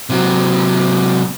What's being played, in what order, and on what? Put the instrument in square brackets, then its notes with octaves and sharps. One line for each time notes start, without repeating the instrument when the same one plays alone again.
[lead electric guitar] C3 F#3